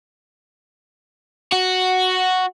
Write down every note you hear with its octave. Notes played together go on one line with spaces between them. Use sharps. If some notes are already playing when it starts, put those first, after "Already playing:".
F#4